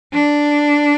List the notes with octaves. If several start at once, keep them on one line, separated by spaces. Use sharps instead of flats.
D4